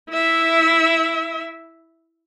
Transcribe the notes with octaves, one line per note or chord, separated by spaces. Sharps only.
E4 E5